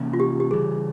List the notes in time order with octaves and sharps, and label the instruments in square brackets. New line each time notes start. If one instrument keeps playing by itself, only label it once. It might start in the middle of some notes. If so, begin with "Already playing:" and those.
Already playing: [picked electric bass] C3 E3 A#3 C#4
[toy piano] F4
G4
G4
[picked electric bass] C#3 E3 G3 [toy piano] G#4